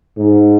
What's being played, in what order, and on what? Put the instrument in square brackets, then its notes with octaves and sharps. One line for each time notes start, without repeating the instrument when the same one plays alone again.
[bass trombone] G#2